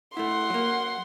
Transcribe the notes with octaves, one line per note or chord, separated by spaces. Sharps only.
A3 E4 F#5 C6
F#3 A#3